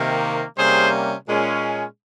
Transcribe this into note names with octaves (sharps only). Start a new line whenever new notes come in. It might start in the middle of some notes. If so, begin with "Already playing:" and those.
Already playing: C3 D#3 A#3
C3 G3 A#3 C#4 G#4 C5
A#2 G#3 C#4